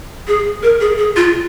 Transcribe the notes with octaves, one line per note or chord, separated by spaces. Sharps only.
G#4
A#4
G#4
G#4
F4